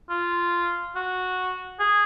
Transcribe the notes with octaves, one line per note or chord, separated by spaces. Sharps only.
F4
F#4
G#4